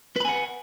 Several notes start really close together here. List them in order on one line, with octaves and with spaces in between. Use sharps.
B4 B5 G#5 F#5